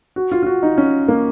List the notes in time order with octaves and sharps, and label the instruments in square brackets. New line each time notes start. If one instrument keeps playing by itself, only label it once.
[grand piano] F#4
F4
F4
F#4
D#4
C#4
A#3